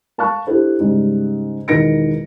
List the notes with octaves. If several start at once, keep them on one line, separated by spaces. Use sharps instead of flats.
F5 A5 B5 C#6 F#6
D4 E4 G4 A4 C5
G#2 C#3 G3
E1 D#3 B4 A#6 C#7 D7